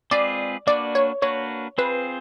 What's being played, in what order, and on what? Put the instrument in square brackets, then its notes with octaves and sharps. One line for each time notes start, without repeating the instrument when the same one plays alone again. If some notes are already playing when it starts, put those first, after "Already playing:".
[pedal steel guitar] G#3 C4 F4 G#4 B4 [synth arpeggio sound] D5
[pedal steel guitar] A#3 D4 F#4 B4 [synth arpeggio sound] D5
[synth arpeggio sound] C#5
[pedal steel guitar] A#3 D4 F#4 B4 [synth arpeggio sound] C#5
[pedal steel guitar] C4 F4 G#4 C5 [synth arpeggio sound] B4